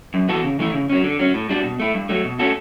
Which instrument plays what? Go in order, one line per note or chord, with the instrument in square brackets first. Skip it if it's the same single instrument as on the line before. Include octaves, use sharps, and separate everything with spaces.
[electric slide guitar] F#2
E3 B3 F#4 A4
C#3
E3 A3 E4
C#3
F#3 C#4
D3
F#3 C#4
A2
G3 D4 F#4
B2
A3 E4
G2
F#3 A3
B2
A3 C#4 F#4 A4